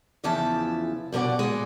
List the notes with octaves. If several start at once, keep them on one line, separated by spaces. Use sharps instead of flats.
E2 C#3 E3 F3 E5 A5
G2 B2 A#4 D5 F#5
A#2 G#3